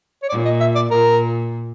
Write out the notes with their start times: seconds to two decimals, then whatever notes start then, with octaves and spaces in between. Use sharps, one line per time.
0.23 C#5
0.29 A#2 D5
0.45 D#5
0.60 E5
0.75 D5
0.91 A#2 A#4